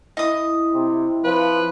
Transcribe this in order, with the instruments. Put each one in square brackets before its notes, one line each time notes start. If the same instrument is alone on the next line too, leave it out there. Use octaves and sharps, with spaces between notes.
[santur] E4 [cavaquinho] D#5 D#6
[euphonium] C3
[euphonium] F3 [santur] C4 [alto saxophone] B4